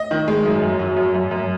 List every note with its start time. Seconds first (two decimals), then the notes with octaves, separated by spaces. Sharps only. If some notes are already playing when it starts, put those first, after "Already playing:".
Already playing: D#5
0.11 D#3
0.28 G#3
0.46 F#2
0.62 F#2
0.79 F#3
0.96 F#2
1.14 F#2
1.31 F#2